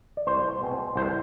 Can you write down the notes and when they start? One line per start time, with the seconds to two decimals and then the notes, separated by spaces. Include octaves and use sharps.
0.17 D5
0.27 C2 C5
0.62 B2 G#3 C4
0.96 C2 C5